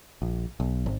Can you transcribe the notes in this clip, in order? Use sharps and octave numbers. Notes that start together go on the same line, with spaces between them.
A#1
B1
G#1